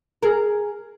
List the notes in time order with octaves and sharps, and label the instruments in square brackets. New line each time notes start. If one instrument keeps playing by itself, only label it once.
[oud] G#4 A#4